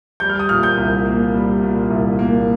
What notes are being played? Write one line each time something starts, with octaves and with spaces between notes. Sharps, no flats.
G3 G6
F6
D#6
A#2 F6
G6
C2
A#3
G3
A#2
C2
A#3